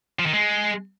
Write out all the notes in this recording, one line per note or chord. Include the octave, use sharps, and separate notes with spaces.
F3
D#3
G#3